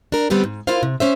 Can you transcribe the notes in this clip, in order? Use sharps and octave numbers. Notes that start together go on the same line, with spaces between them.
D4 A#4
D3 G3 B3 C4 G4
G#2
E4 F4 A#4 C5 F5
C3
C#4 C5 E5